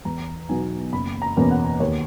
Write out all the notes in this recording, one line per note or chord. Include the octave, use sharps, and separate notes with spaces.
E2 A#5
B2 F#3 B3 D#4 G#5
F#1 B5
A#5
E2 B2 A#3 C#4
F#5
D#2 C#5